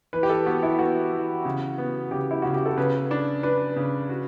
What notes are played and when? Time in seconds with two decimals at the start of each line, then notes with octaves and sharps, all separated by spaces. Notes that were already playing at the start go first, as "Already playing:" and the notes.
0.13 E3 B4
0.23 G4
0.30 A4
0.46 B3 F#4
0.63 E4
0.79 B3 F#4
1.13 E3
1.45 C#3
1.78 B3
2.11 C#3 G4
2.31 E4
2.42 C#3 F#4
2.54 G4
2.66 A4
2.77 C#3 B4
3.11 D4
3.43 D4 B4
3.76 C#3
4.09 F#4